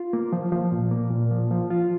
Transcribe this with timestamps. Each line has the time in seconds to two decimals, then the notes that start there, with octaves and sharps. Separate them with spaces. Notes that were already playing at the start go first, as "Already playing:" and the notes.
Already playing: F4
0.13 A#3
0.33 F3
0.52 F3
0.72 A#2
0.91 A#3
1.11 A#2
1.31 F3
1.51 F3
1.70 F4